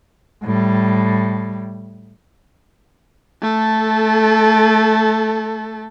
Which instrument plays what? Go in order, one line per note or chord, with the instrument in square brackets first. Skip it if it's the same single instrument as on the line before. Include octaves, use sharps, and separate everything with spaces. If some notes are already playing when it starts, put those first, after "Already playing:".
[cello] A2 G3
[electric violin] A3 A4